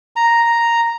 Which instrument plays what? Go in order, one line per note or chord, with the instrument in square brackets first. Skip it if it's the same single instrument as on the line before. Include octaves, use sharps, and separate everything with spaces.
[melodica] A#5